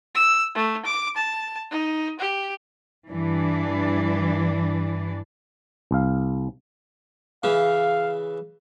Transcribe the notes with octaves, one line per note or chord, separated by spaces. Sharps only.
E6
A3
D6
A5
D#4
G4
G2 E3 D4
C2 F5
C#3 E3 F5